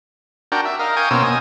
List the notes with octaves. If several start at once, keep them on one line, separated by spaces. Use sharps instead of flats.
D4 F#4 A#4 G5
E5
A#4 D#5 F5
F5 G5 G#5 C#6 D#6
B2 A#3 C#4 C5 E6
D#5 G#5